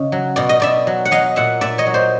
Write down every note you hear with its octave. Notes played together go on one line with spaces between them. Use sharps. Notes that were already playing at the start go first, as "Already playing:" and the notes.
Already playing: C#3 D#5 F5
F#3
B2 D5
D#5
B2 D5 E5
F#3
F#5
F#3 D#5 F5
A#2 E5 F#5
A#2 D5 E5
C#5 D#5
F#3
C5 D5